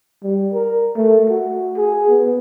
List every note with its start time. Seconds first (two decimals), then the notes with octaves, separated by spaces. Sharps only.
0.24 G3
0.53 A#4
0.96 A3
1.29 F#4
1.77 G#4
2.09 B3